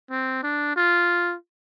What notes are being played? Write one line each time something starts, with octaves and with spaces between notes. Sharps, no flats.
C4
D4
F4